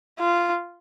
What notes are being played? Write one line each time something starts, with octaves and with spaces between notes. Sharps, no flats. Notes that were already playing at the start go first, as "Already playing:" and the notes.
F4